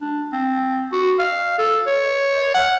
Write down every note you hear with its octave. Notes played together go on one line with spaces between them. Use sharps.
D4
C4
F#4
F5
A4
C#5
F#5